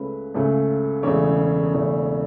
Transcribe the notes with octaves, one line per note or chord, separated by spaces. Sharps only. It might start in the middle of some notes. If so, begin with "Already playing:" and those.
Already playing: C#2 C#3 A3 B4
C#2 C#3 A3
E1 E2 C#3 A3 C#5
E1 E2 C#3 A3